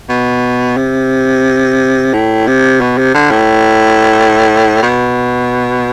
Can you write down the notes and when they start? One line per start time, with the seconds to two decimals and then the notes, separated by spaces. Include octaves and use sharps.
0.09 B2
0.77 C3
2.13 A2
2.47 C3
2.81 B2
2.98 C3
3.14 D3
3.31 A2
4.83 B2